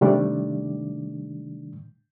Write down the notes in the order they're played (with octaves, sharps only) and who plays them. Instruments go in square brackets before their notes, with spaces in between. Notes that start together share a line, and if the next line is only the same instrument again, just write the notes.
[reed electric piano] C3 D#3 G3 A3 D4